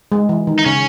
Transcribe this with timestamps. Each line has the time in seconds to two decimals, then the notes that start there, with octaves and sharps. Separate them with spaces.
0.12 G#3
0.29 E3
0.47 D#3
0.59 D#4
0.66 C#3 C#4